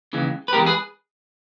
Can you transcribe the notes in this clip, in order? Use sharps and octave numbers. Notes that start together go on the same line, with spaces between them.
D#2 C#3 E3 G#3
B4
B2 G#3 G4 A#4
E2
G#4 B4